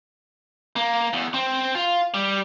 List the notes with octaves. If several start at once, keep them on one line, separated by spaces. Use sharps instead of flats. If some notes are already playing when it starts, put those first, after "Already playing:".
A#3
E2
C4
F4
G3